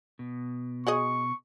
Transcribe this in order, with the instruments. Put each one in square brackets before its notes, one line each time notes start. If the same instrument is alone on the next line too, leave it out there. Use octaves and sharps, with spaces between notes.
[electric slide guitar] B2
[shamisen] F#4 G#4 D#5 [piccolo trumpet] C#6